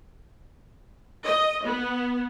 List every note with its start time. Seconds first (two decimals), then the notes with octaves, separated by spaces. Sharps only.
1.24 D#5
1.64 B3